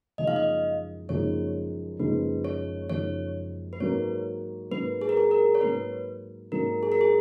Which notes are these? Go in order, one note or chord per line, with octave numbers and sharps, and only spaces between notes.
F#1 F#2 F3 G#3 D#4 D#5
F5
D#5
F#1 F#2 F3 G#3 D#4 C#5
F#1 F#2 F3 G#3 D#4 B4
C#5
F#1 F#2 F3 G#3 D#4 C#5
B4
G#2 F#3 A#3 C#5
G#2 F#3 A#3 B4
G#4
A#4
G#4
A#4
C#5
G#2 F#3 A#3 B4
G#2 F#3 A#3 A#4
G#4
A#4
G#4